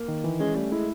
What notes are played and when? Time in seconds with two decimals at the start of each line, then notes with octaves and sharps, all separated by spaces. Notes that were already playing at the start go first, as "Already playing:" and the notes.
Already playing: A#3
0.08 D#3
0.24 E3
0.40 G#3 C#4
0.56 G3 A3
0.71 G#3 E4